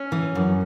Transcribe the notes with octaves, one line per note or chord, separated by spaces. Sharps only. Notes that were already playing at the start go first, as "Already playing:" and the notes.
Already playing: C#4
E3
F#2